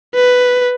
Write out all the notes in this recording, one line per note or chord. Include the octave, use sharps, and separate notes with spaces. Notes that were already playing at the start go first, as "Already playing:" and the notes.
B4